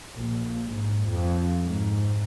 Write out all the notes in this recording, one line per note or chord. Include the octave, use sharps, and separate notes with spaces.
A#1
G#2
F2
G#2